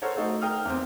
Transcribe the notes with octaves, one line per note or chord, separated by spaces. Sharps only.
A4 A#4 C5 C#5 F#5
A3 D#4 F#4 A4 C5
A#4 G5 D#6 F6
E2 C4